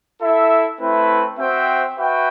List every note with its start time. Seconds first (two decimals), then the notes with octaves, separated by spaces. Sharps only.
0.21 E4 A4 E5
0.80 A3 C4 E4 B4
1.38 C4 F#4 C5 E5 G5
1.98 F#4 B4 E5 G5